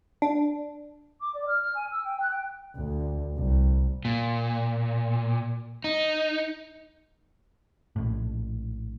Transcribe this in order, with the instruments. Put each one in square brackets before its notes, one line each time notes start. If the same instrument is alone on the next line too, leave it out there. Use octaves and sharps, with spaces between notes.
[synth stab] D4
[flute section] D6
D5
F6
F6
G#5
E6
G5
F#6
G5
[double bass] D2
C2
[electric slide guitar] A#2
D#4
[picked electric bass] A#1 A2